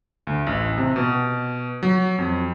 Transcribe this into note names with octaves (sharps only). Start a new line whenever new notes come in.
D2
A1
C3
B2
F#3
F2